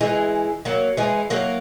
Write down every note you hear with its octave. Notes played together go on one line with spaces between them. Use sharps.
E3 G#3
F#3 A#3
E3 G#3
F#3 A#3